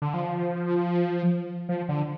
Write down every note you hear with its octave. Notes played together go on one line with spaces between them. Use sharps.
D3
F3
F3
D3